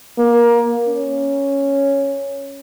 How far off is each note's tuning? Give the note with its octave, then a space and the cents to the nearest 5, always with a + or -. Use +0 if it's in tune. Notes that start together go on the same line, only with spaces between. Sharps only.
A#3 +20
C#4 +0